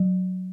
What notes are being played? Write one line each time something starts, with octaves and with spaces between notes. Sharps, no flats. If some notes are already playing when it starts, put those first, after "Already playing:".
Already playing: F#3